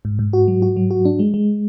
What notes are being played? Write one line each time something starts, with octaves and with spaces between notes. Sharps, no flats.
G#2
G#2
F#4
F#3
F#4
F#3
F#4
D4
G#3
G#3